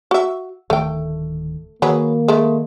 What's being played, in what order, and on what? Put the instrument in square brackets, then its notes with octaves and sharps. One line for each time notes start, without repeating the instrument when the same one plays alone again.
[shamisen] F#4 E5
[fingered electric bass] D1 D#3 [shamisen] A3 G5
[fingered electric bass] D#3 [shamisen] F#3 G#4 B4 [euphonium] A#3
[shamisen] G#3 A3